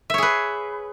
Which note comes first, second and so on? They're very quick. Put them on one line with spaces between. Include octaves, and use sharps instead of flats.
E5 C#5 G#4 B4